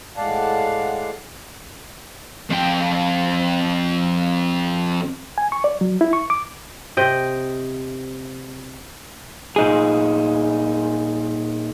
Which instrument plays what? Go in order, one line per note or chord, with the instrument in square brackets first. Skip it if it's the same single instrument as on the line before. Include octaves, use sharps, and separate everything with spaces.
[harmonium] A2 G#3 D5 F5 F#5 A5
[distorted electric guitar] F2 G5
[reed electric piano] G#5
C#6
D5
F#3
E4
C#6
D6
[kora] C3 D#5 G5
[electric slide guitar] A#2 D#4 G#4